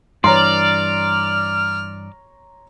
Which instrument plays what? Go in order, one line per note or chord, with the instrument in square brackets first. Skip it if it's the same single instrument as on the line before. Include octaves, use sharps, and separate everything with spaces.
[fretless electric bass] G2 E3 [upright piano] C#5 A#5 C6 [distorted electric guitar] D5 [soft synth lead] F6